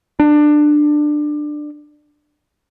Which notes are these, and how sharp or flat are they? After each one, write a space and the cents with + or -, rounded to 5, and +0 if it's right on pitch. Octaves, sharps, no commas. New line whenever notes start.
D4 +20